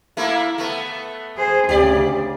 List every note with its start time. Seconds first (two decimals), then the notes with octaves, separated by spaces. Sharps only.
0.17 A3 A#3 E4
0.58 A3 B3
1.37 G#4 C5
1.69 D2 C#3 G4 D5